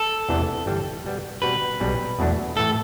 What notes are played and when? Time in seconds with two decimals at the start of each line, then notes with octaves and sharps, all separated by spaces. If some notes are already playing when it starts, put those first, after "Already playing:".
Already playing: A4
0.29 E2 C3 E3 A3 D4
0.66 G1 G2 E3 G3 D4
1.04 B2 G3 B3
1.42 B2 G3 C4 F#4 B4
1.80 B1 B2 G3
2.19 E2 B2 F#3 A3 D4
2.56 A2 E3 A3 A4